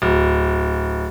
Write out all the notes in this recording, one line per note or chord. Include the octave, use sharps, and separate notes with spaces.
D1